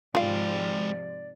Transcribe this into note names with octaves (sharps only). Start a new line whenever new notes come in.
G#2 C3 F3 G#3 F4 D5 F5 G5